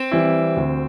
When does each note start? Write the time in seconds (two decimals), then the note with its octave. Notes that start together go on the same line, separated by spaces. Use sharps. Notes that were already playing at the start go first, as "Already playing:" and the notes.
Already playing: C4
0.12 E3 G3 E4
0.57 D2